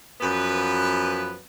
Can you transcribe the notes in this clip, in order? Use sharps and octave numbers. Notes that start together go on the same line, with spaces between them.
F#2 F3 B3 B4